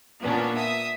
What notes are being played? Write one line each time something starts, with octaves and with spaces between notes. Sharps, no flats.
A#2 B3 C#4 D4
E5 D#6